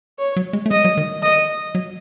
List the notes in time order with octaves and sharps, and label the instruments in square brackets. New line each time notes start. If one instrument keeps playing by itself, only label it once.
[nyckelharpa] C#5
[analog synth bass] F#3
G#3
A3
[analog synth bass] G#3 [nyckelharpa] D#5
[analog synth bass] F#3
D#3
[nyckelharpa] D#5
[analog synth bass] F#3